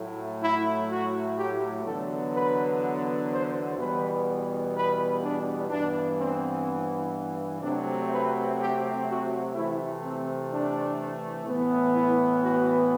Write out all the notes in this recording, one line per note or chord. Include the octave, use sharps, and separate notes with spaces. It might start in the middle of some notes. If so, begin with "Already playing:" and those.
Already playing: A2 F#3 A3
E4
F#4
G4
E2 D3 F#3 B3 A4
B4
C5
E2 B2 G3 B3 B4
B4
D4
G2 E3 B3 D4
C4
C3 F#3 A3 C4 D4
B4
G4
F#4
C3 E3 A3 C4 E4
C4
D4
A2 E3 B3
E4
F#4